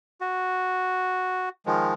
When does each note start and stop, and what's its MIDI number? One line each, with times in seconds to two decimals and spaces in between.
0.21 1.49 66
1.66 1.94 51
1.66 1.94 53
1.66 1.94 56